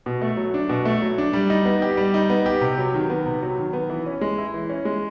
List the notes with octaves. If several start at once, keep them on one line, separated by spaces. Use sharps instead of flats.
B2
A3
F#3
D4
B2
A3
F#3
D4
G3
D#4
B3
G4
G3
D#4
B3
G4
C3
F#3
D#3
B3
C3
F#3
D#3
B3
E3
C#4
G#3
E4
E3
C#4
G#3